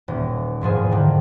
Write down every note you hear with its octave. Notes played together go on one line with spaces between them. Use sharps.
D#1
E1 G#2 F3 G#4
D3 D#3 F3